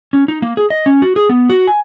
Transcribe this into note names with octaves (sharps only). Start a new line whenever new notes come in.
C#4
D#4
A#3
G#4
D#5
C#4
F#4
G#4
B3
F#4
G#5